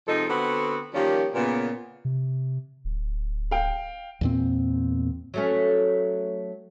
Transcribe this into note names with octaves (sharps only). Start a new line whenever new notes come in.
C3 F3 G#3 D#4 A4
D3 B3 C4 F#4 A4
D#3 F3 G3 A#3 C#4 G4
A#2 C#3 B3
C3
D1
F5 G5
E2 A#2 C4
F#3 A3 C#4